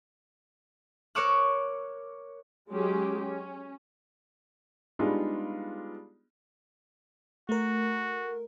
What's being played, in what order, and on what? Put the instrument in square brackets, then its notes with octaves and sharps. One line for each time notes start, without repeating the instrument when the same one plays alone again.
[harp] A#4 C#5 C#6 D6 E6 F#6
[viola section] F#3 G#3 C#4 G4
C#4
[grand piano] G3 G#3 B3 D4 D#4 F4
[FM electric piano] A3 A#4 [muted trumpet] F#4